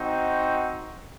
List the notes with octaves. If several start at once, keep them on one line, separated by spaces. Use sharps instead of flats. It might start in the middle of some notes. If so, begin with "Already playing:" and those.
Already playing: C4 D#4 F#4